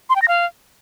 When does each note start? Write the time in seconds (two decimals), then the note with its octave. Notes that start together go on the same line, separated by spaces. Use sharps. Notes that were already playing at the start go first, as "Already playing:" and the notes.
0.10 C6
0.16 G5
0.22 A#6
0.28 F5